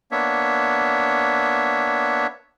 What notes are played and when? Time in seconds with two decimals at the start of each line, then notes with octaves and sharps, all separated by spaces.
0.12 A#3 B3 D4 C#5 E5